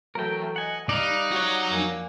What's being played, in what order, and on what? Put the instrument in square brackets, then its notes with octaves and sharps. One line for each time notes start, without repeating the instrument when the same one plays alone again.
[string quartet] E3 F#3 A3 [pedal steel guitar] A#4 G5
[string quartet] D#5 [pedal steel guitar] F#5 G#5
[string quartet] G3 F#6 [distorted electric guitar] D#4 [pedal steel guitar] D5 F5
[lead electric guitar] F#4 C#5
[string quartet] F2 A#3 G#5